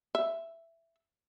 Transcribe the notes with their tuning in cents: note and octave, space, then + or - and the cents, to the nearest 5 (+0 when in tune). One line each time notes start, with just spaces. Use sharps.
E5 +10